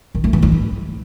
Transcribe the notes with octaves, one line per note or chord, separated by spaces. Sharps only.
D#3
A3
E3
D#4
E4